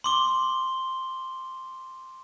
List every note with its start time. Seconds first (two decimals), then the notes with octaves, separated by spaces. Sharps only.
0.04 C6 D6 G7